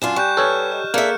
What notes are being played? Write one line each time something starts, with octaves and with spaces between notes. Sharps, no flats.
F#2 D4 F4 G#5 E7
G3 C#6 F#6 G6
A4 B4 C#5 G#5 F6
G4 D#5
A#3 D4 G#4 A4 E5 F6 C#7